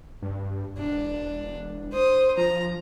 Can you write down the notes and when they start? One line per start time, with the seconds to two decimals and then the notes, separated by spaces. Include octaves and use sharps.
0.22 G2
0.78 E1 D4
1.93 C5 D#6
2.37 F3 A#5